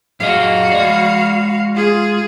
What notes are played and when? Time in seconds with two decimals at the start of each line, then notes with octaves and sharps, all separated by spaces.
0.20 F#2 F#4 G#4 D#5 F5
0.72 G#3 D5
1.75 F4 G#4